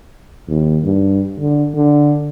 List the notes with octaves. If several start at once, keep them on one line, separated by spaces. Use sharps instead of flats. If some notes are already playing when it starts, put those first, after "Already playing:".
D#2
G2
D3
D3